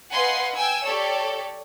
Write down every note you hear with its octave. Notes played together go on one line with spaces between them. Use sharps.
B4 D#5 F5 F#5 G#5 C6
G5 G#5 E6
G4 A4 C#5 D5